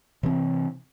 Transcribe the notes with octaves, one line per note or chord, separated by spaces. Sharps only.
C3 E3 C4